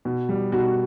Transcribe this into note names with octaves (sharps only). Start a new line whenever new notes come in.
B2
G3
B2 F#4